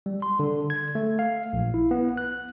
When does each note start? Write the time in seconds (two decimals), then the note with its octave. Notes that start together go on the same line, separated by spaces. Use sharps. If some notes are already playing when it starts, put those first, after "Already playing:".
0.06 G3
0.22 C6
0.39 D3
0.70 G#6
0.95 A3
1.19 F5
1.53 A#1
1.74 E4
1.91 B3
2.17 F#6